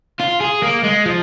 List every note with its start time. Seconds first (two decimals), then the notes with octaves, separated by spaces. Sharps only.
0.20 F4
0.41 G#4
0.63 A#3
0.84 G#3
1.06 F3